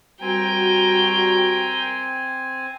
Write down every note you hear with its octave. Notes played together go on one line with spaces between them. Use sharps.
G3 C4 F#4 A#4 G5 G#5